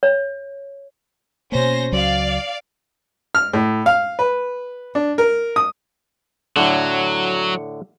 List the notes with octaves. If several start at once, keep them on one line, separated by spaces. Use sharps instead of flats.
C#5
B2 A#3 C#4 C5 A#6
C#2 F#3 D5 F5
F6
A2
F5
B4
D4
A#4
D#6
A2 D3 F#3